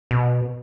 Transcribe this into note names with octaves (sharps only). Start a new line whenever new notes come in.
B2